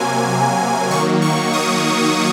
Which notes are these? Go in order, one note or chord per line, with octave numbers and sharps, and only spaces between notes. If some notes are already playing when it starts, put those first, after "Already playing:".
Already playing: C3 F#3 A#3 G#5
D#3 F#3 A#3 C#6
C#6
D#6